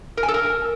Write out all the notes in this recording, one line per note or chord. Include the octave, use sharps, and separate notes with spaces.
A#4
G#5
A4
A#4